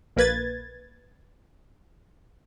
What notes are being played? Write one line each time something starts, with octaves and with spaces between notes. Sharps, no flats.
A#1 A#3 B4 G#6 A6